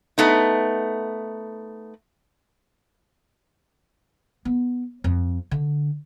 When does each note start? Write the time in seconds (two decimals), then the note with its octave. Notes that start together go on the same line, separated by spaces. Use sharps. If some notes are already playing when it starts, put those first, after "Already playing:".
0.18 A3 B3 D#4
4.45 B3
5.04 F2
5.51 D3